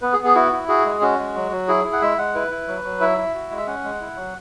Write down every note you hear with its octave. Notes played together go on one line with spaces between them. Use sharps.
B3 B4
G#4
B3
G#4
E4 F#4
E4
F#4 G#4
G#3
C#4 F#4
G#3
F#3
F#3
E4 G#4
E4
F#5
G#3 E5
G#3 F#5
E4 B4
E4
F#3
F#3
E4 E5
E4
F#4
G#3
E5
C#4 F#5
G#3
E4
F#3